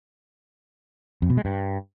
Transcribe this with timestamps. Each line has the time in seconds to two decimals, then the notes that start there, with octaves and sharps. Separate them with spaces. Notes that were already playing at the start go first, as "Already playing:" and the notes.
1.22 F2
1.30 B2
1.37 G#3
1.45 G2